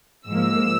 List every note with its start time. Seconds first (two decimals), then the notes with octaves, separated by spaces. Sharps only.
0.28 G#2 F3 A#3 E6